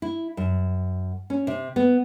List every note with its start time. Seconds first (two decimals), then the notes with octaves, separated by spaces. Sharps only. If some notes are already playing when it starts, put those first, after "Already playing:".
0.02 E4
0.37 F#2
1.30 C#4
1.47 C3
1.76 B3